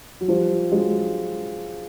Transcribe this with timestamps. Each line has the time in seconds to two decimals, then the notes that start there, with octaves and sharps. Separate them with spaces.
0.21 F#3
0.28 F3 G3
0.71 F#3 G#3